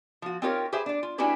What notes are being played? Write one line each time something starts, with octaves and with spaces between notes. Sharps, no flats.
F3 F#4
C4 D#4 F4 G4 A#4 C#5
G4 G#4 B4 C5 E5
D4 D5
F4
C#4 D4 E4 F#4 G4 B4